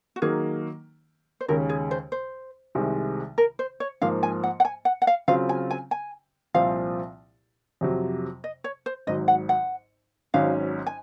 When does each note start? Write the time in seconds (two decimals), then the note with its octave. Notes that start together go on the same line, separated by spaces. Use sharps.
0.16 F#4
0.22 D#3 F#3 A#3 G#4
1.41 C5
1.48 D#2 C#3 G#3 C#4 A#4
1.69 G#4
1.91 C5
2.12 C5
2.75 C2 C3 D#3 G#3
3.38 A#4
3.59 C5
3.80 C#5
4.02 G#2 F3 A#3 F5
4.23 G#5
4.44 F#5
4.60 F#5
4.65 G#5
4.85 F#5
5.02 F#5
5.07 F5
5.28 C#3 F#3 C4 F4 F5
5.49 G#5
5.71 G#5
5.91 G#5
6.54 C2 A#2 F3 C4 F4 F5
7.81 F2 C3 F#3
8.44 D#5
8.64 C#5
8.86 C5
9.07 G#1 G#2 F#3 D#5
9.28 F#5
9.49 F#5
10.34 G#1 G#2 F#3 C#4 F5
10.87 G#5